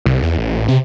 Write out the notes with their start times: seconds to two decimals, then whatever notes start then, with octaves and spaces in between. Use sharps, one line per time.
0.06 C2
0.23 E2
0.38 A1
0.68 C3